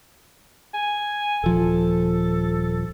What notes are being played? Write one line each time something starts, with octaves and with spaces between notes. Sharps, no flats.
G#5
D#1 F3 A4